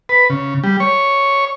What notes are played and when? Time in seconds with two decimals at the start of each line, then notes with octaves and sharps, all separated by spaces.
0.09 B4
0.30 C#3
0.63 G3
0.80 C#5